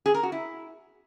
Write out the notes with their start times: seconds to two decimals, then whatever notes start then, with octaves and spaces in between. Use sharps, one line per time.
0.06 G#4
0.14 A#4
0.23 F#4
0.32 E4